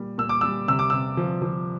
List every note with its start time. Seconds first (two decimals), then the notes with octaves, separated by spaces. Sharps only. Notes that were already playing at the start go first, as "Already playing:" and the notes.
Already playing: A#2 G3
0.18 A#2 E6
0.29 D6
0.41 G3 E6
0.68 C3 E6
0.79 D6
0.90 C3 E6
1.17 F3
1.42 F3